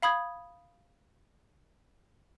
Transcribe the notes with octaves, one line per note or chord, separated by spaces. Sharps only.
F5 B5 D#6 G#6